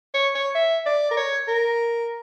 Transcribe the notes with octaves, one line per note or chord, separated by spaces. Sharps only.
C#5
C#5
E5
D5
A#4
C#5
A#4